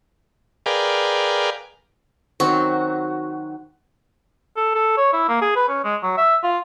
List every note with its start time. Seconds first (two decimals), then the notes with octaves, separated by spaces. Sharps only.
0.66 G#4 A#4 B4 D5 F5 G5
2.40 D#3 F#3 C4 F#4
4.57 A4
4.75 A4
4.97 C#5
5.13 E4
5.29 A#3
5.42 G#4
5.56 B4
5.69 C#4
5.84 G#3
6.03 F#3
6.17 E5
6.43 F4